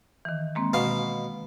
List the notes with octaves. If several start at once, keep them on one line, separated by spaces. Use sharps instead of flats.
D#3 E3
G#3 A#3 C4
B2 F5